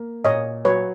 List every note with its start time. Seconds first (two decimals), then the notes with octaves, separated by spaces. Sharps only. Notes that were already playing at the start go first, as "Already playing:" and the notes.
Already playing: A#3
0.24 A#2 C#5 D#5
0.65 F#3 B4 C#5